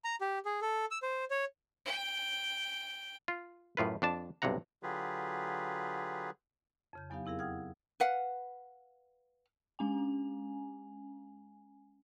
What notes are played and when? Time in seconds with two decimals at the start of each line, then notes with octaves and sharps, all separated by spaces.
0.05 A#5
0.21 G4
0.45 G#4
0.62 A4
0.91 E6
1.03 C5
1.31 C#5
1.86 G5
3.28 F4
3.77 F#2 A2 F4 B4
4.02 F2 D4 A5
4.42 B1 G2 C3 F#5 A#5
4.83 D3 F#3 F4 G4 G#4 B4
6.93 F2 C#3 G6
7.10 E2 F#3 B3 D#4 G4 F5
7.25 B3 C4 E4 G#4 A#4 F5
7.39 F#5 G5 D#6 F6 G#6
8.00 B4 F5 F#5
9.79 G#3 C#4 G#5